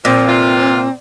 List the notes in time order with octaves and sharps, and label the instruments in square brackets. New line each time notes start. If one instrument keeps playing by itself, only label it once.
[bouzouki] A#2 [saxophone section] F3 [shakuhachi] C4
[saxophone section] C3 E3 F4